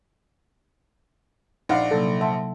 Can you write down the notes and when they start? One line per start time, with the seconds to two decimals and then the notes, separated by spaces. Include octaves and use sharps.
1.69 A#1 D#4 D5 F5 F#5
1.91 C3 F#3 A#3 A4
2.21 E5 F#5 A5 C6